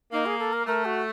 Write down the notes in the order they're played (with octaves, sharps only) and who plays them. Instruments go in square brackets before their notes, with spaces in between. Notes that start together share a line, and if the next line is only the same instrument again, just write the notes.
[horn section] A#3 [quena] D#4
[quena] G#4
A4
A#4
[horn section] A3 [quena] A#4
[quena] F#4